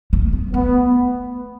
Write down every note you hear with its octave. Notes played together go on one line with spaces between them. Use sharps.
A3
B3
A3 B3